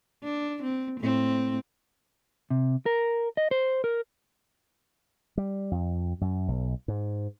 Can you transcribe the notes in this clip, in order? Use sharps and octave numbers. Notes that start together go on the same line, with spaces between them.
D4
C4
A2 C4
C3
A#4
D#5
C5
A#4
G3
F2
F#2
B1
G#2